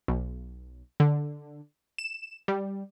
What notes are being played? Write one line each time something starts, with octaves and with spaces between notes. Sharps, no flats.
B1
D3
E7
G3